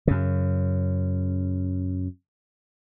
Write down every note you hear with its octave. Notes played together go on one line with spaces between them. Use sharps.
F#2 C#3